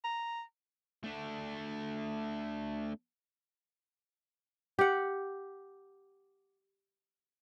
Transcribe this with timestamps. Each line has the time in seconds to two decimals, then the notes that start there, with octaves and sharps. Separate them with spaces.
0.04 A#5
1.04 A3 D4
4.79 G4 F#5